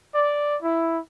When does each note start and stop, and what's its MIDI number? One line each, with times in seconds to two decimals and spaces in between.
0.14 0.56 74
0.63 0.99 64